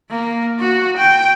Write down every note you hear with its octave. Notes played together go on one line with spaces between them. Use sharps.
A#3
F#4
G5